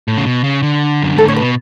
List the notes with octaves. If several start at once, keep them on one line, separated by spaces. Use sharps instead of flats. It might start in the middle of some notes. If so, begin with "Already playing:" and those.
A2
C#3
B2
C#3
D3
F#2
G#2 A4
A2 C#5
B4
B2